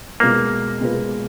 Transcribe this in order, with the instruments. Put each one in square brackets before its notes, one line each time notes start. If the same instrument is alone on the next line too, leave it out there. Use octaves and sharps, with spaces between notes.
[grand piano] B2 G#3 B3 F4 B4 [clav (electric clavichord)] A#3
[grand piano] B2 G#3 B3 F4 B4